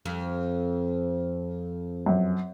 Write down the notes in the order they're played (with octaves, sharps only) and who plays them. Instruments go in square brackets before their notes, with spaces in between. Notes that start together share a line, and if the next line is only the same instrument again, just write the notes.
[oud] F2
[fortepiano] F#2